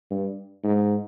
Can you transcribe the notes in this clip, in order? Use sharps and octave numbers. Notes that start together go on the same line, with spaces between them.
G2
G#2